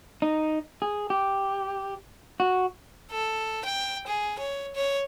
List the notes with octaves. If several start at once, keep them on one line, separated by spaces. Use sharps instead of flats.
D#4
G#4
G4
F#4
A4
G5
G#4
C#5
C#5